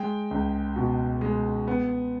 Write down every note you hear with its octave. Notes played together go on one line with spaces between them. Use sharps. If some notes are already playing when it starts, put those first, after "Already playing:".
Already playing: G#3 G5
C#2
B2
G#3
B3